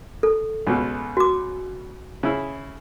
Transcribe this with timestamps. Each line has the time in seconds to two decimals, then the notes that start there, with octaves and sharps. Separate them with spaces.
0.23 A4
0.67 C#2 B2
1.17 F#4 D6
2.23 C#3 E4